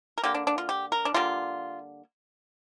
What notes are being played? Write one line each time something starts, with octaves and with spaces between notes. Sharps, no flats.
A#4
D3 A#3 G4
D4
D4
F4
G4
A#4
D4
D3 G3 A#3 F4